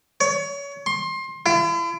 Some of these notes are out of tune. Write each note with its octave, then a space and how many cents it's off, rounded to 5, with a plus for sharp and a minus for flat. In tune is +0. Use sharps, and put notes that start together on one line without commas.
C#5 +30
C6 +25
E4 +45